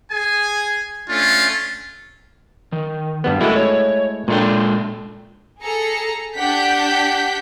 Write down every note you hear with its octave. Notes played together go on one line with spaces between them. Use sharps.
G#4 G#5
A3 C#4 D4 F4
D#3
G2 G3 B3
G#3 A3 E4 F#4 A#4
C#5
A#2 G#3 D4 A4 G5
G#4 A4 A#5 C#7
D4 G4 F#5 G6 B6